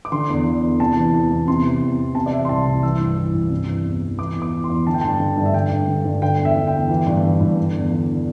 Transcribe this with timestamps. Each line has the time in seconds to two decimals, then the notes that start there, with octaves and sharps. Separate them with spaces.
0.05 D6
0.12 D3 C6
0.29 E2
0.45 D3
0.63 E2
0.80 C3 A5
0.97 E3
1.13 E2
1.31 E2
1.48 C3 C6
1.65 E3
1.81 E2
1.98 E2
2.15 C3 A5
2.26 D5
2.33 E3 E5
2.45 C6
2.49 C2 A5
2.67 C2
2.83 E3 E6
3.00 G2
3.17 E3
3.34 G2
3.50 C3
3.67 E3
3.84 E2
4.02 E2
4.19 E3 D6
4.36 E2
4.42 D6
4.52 E3
4.64 C6
4.70 E2
4.87 D3 A5
4.94 G5
5.01 G2 A5
5.20 D3
5.37 G2
5.46 E5
5.54 D3 G5
5.71 G2
5.88 D3
6.05 G2
6.22 D3 G5
6.39 E2
6.45 E5
6.56 D3
6.67 G5
6.73 E2
6.89 E3
7.06 G2
7.24 E3
7.40 G2
7.58 D3
7.75 E2
7.91 D3